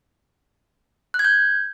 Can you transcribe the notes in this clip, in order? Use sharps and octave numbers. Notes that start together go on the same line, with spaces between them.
F#6
G#6
G6